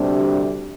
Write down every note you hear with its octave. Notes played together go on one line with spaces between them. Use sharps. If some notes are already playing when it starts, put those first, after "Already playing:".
Already playing: D2 C3 G3 D4